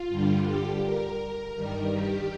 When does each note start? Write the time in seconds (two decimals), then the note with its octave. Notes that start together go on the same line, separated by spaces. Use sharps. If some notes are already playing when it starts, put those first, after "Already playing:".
Already playing: F4
0.09 G2 D3 G3
0.46 G4
0.84 A#4
1.56 G2 D#3 G3
1.93 G4